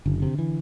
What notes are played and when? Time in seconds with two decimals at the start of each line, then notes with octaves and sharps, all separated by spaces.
0.06 F#1 D3
0.22 C3
0.39 E3